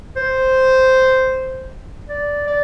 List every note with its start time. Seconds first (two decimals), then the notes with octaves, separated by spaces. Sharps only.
0.16 C5
2.09 D5
2.47 D5